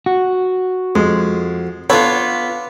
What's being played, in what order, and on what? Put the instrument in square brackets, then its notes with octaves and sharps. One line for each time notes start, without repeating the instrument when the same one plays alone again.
[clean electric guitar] F#4
[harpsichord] F2 [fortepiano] G#3
[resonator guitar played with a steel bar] B3 F4 [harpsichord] D4 B4 [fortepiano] A4 C#5